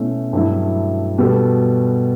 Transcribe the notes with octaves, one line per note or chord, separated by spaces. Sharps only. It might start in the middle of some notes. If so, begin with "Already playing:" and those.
Already playing: B2 A3 C#4 E4
G2 F#3 A3 E4
B2 G3 B3 F#4 A4